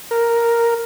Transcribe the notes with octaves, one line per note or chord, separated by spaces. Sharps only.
A#4